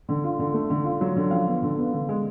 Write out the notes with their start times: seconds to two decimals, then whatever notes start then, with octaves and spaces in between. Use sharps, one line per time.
0.09 D3
0.24 F4
0.39 D3
0.54 A3
0.70 D3
0.84 F4
1.01 F#3
1.16 D3
1.31 F3 F5
1.47 B3
1.63 D3
1.77 B3
1.93 D3
2.09 G#3